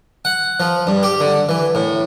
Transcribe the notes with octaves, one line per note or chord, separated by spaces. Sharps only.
F#5
F3
G2
G4
D3
E3
A2